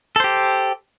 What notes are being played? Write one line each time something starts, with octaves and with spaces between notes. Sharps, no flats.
G4 A4 C5